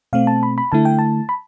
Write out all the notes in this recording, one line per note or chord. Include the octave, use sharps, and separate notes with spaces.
B2 A3 C4 F5
A5
B5
B5
D3 A3 E4 A5
G5
A5
B5